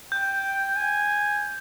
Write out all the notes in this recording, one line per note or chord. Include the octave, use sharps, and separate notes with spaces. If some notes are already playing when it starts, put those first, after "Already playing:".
G5 G6
G#5